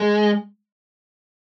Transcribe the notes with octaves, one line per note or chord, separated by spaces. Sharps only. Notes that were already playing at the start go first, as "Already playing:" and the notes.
Already playing: G#3